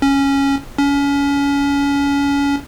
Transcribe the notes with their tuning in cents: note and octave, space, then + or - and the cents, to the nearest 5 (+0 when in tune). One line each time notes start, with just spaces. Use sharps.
C#4 -5
C#4 +30